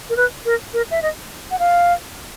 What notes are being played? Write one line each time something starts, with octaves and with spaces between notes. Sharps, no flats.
A#4
B4
A#4
A#4
E5
D#5
F#5
F5